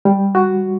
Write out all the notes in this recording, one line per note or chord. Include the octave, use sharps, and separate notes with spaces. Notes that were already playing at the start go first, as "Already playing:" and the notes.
G3
F#4